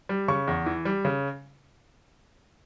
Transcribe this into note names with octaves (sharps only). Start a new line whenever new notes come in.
G3
C#3 C#6
E2
E3
G3
C#3